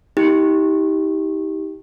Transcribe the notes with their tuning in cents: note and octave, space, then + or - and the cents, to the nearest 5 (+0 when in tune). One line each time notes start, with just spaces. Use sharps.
D#4 +45 G4 +0